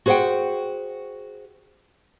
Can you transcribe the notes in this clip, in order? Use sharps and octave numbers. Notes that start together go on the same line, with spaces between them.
F#4 G#4 C5 C#5 F#5 G5